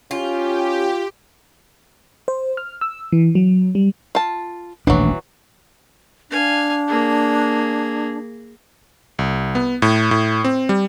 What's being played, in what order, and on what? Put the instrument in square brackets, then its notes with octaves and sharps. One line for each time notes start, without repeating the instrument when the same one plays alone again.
[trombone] C#4 [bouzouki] F4 [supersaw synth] G4
[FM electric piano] C5
F6
E6
E3
F#3
G3
[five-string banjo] F4 A5
[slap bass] D#1 A1 D4 [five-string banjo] E3 F#3
[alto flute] D4 [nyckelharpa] F5 G#5
[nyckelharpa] A#3 G#4
[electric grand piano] C2
B3
A2
A2
C4
G3